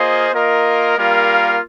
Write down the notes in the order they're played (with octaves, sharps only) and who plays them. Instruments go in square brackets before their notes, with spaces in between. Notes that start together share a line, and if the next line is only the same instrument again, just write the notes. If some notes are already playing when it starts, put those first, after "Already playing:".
Already playing: [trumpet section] A#3 F4 G#4 C5 D#5
A#3 F4 A#4 D#5
G3 A#3 F4 A#4 F5